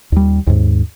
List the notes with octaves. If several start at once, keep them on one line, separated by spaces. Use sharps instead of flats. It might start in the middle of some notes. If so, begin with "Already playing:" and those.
D#2 G3
D#2 G#2